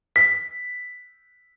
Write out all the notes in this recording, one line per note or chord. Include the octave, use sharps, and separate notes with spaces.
B6